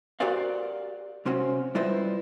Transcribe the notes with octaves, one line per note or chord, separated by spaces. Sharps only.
F#4 G4 A#4 C5 D5 F5
C3 C4 C#4 F#4
G3 E4 F4 B4 C5 D#5